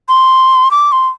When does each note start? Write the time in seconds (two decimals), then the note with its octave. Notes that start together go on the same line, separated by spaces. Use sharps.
0.09 C6
0.71 D6
0.92 C6